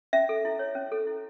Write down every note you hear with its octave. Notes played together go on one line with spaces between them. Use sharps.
C#4 E5
A4
E4
C#5
C#4
A4
E4